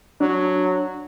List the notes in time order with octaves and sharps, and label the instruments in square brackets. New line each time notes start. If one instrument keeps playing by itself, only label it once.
[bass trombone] F#3 [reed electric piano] D4